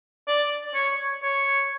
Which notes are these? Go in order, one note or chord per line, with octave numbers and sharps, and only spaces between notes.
D5
C#5
C#5